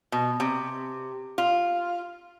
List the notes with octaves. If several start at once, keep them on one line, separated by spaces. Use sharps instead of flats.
B2
C3
F4